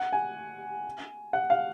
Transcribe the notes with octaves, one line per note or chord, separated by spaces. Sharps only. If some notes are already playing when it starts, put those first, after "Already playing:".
Already playing: F#5
G#5
F#5
F5